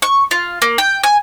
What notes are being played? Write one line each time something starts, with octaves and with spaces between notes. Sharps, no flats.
C#6
F4
A#3
G5
G#5